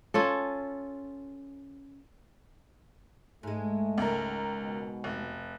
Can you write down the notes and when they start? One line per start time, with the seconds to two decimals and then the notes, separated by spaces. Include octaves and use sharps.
0.14 C#4 F4 A4
3.43 G#2 G#3 A3
3.98 C#2 A#4
4.56 B2
5.04 F1